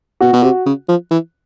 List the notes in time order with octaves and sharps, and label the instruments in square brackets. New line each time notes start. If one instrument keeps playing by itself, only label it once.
[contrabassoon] B2 [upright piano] F#4
[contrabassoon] B2
C3
C#3
F3
E3